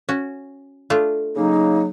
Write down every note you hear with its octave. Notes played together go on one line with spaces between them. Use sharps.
C#4 F#4
A3 D4 F4
C#3 F#3 A#3 D#4